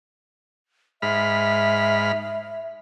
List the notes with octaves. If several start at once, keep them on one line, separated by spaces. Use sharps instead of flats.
G#2 E5 B5 F6